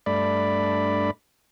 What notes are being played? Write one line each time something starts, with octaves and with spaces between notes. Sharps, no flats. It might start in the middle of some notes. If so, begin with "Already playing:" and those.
G2 A3 D4 D5 B5